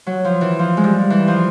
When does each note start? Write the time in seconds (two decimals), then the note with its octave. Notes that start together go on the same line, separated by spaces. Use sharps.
0.06 F#3
0.24 F3
0.41 E3
0.59 F3
0.77 G#3
0.84 G3
1.10 E3
1.28 F3